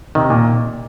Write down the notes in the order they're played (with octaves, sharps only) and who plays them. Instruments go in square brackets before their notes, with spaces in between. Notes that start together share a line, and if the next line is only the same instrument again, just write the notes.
[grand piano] C3 [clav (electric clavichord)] D#3
[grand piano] A#2